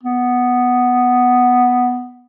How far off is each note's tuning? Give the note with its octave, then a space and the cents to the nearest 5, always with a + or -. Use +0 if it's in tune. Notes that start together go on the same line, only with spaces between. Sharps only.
B3 +0